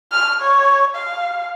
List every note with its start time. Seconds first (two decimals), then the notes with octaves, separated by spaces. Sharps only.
0.12 F6
0.41 C#5
0.96 F5